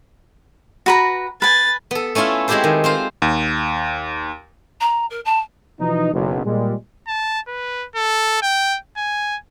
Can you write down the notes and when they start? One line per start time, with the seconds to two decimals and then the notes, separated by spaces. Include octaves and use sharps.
0.86 F#4 B4 A#5
1.42 B4 G#5 A6
1.91 B3 A4
2.15 A3 C#4 E4 F4 E5
2.48 G#3 C4 E4 G4 A4 C5
2.64 D#3
2.84 C4 F4 C5
3.22 D#2
4.80 A#5
5.10 A#4
5.25 A5
5.80 B2 E3 F3 B3 D#4
6.13 F#1 B1
6.44 A#2 G3 G#3
7.07 A5
7.48 B4
7.96 A4
8.42 G5
8.97 G#5